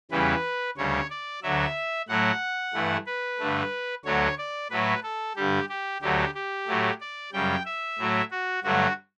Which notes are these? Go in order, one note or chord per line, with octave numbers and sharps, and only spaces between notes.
E2 C#3 E3 G3 B4
D2 C#3 G3 C#5
D5
D2 D3 F#3 E5
A2 F#3 A3 F#5
G2 E3 A3
B4
G2 D3 A3
D2 D3 F#3 A3 C#5
D5
A2 F#3 A3 B4
A4
G2 D3 G3 G4
G4
D2 D3 F#3 A3 G4
G4
A2 F#3 A3
D5
F#2 C#3 G3 G5
E5
A2 F#3 A3
F#4
G2 D3 F#3 A3 F#4